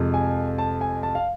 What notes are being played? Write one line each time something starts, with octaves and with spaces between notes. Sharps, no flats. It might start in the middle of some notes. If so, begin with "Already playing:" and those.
Already playing: F2 C3 F3 G#3
G#5
A5
G#5
A5
F5